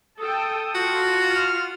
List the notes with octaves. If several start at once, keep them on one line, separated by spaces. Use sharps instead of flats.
A4 G5 D#6
F4 F#4 A4
F6